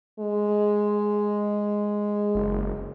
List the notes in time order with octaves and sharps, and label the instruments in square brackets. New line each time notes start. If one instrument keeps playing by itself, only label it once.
[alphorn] G#3
[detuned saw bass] F#1